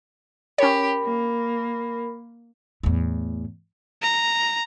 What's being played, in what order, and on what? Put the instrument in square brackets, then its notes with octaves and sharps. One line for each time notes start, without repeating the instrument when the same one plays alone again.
[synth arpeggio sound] C#4 C#5 [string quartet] G4 [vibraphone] A#4 B5
[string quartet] A#3
[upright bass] E2 A2
[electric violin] A#5